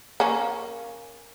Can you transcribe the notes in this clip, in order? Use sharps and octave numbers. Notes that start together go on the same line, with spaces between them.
A#3 C#4